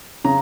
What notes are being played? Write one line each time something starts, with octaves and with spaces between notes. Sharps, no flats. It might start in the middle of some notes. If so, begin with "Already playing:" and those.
C#3 A#5